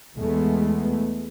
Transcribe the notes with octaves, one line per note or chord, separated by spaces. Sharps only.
E2 G#3 A3 B3